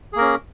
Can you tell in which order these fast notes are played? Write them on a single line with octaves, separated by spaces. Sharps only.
G#4 A#3 A#4 C#4